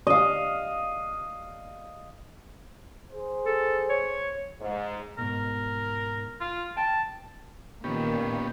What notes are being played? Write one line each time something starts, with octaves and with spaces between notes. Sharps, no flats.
D#5 F5
G#4 C5
A4
C#5
G#2
G#2 B2 A#4
F4
G5 A5
A#2 D#3 B3 C#4 G4